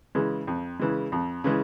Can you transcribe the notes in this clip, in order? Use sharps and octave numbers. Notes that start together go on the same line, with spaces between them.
C#3 E3 G#3
F2
C#3 E3 G#3
F2
C#3 E3 G#3